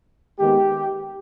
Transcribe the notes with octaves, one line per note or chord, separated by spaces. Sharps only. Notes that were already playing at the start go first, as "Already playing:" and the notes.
D#2 D#3 G#3 B3 G4